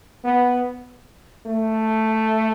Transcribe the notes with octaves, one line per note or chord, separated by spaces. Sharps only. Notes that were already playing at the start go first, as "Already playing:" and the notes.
B3
A3